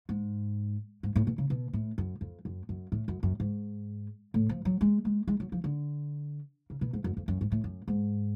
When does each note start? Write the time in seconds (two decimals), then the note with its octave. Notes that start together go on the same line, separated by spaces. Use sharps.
0.09 G#2
1.03 G#2
1.16 A2
1.27 B2
1.38 C#3
1.50 B2
1.73 A2
1.98 F#2
2.21 F2
2.45 F#2
2.69 F#2
2.92 A2
3.08 F#2
3.23 F#2
3.40 G#2
4.34 A2
4.49 F3
4.65 F#3
4.81 G#3
5.05 G#3
5.28 G#3
5.40 F#3
5.52 F3
5.64 D3
6.70 C#3
6.81 B2
6.93 G#2
7.04 F#2
7.17 F2
7.28 F#2
7.41 G#2
7.52 A2
7.64 F#2
7.88 G#2